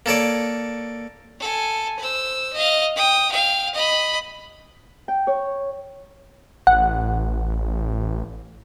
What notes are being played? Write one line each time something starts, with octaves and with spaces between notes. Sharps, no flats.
A#3 A4 C#5 D5
A4 G#5
C5 E6
D#5 F5
G5 D#6
F5 G5
D#5 B5
G5
C#5
A1 F#5